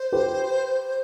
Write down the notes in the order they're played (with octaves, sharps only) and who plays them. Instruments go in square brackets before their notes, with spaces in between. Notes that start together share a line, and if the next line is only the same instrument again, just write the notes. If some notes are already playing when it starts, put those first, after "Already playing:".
Already playing: [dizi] C5
[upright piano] G4 B4